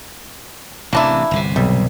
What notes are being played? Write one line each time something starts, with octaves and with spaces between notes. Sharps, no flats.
A1 C3 E3 A#3 D4 E4
G1 C2 C3
B1 G3